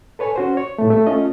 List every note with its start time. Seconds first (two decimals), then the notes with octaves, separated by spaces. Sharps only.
0.19 A4 B4 C#5 G#5
0.36 C#4 F#4 C5
0.57 C#5
0.78 A2 A3
0.90 A3 E5
1.07 C#4 F4 D#5